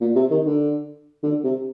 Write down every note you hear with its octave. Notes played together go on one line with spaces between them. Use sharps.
A#2
C3
D#3
D3
D3
C3